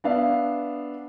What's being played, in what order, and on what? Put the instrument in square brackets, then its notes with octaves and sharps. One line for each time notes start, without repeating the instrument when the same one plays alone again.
[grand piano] B3 D4 E5 F5